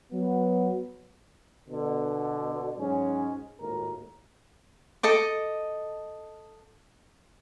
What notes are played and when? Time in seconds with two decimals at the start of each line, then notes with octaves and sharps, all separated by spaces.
0.12 F#3 B3
1.69 B2 D3
2.79 G#2 F#3 G#3 C#4
3.61 G#1 D#2 A2 A#4
5.03 A4 D#5 D6